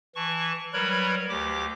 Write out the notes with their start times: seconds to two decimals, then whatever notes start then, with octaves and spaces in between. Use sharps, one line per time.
0.15 E3 A5 C#6
0.74 F#3 G3 A#4 B4 C#5 B5
1.29 D2 G4 D6